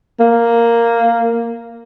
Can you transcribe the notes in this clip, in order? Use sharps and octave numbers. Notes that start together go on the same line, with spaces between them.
A#3